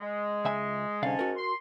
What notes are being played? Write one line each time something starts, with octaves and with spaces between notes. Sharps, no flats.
G#3
C#2 E5 G#5
C2 G#2 D3 C#4 F5 A5
F#4 A#4
C6